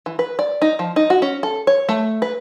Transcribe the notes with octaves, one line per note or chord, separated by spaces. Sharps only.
E3
B4
D5
D#4
F3
D#4
F#4
C#4
A4
C#5
A3
B4